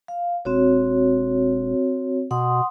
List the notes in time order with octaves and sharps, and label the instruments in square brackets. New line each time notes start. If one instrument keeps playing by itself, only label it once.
[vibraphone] F5
[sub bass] E1 [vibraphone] C4 F#4 C#5
[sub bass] B2 [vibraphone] F#5 C6 D#6